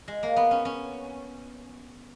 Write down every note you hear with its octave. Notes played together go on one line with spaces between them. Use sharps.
G#3
A#3
B3
C#4
C#4